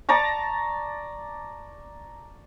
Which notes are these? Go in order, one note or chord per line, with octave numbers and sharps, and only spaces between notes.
D5 A5 A#5 C#6